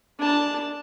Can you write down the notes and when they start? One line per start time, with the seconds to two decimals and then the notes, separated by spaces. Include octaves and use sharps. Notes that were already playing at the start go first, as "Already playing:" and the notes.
0.19 D4 A5